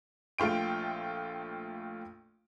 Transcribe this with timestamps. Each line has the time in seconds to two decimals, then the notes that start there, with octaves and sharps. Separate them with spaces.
0.38 A#1 A3 F4 G5 D7